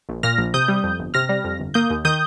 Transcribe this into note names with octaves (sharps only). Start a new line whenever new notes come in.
A#1
A#2 F6 A#6
A#1
C3 D#6 G6
G3
F2
G1
C3 F6 A#6
G3
F2
G1
A#3 D#6 G6
D#2
D#3 D#6 G6